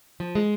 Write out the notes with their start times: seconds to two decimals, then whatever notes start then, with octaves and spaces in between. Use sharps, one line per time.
0.20 F3
0.35 G#3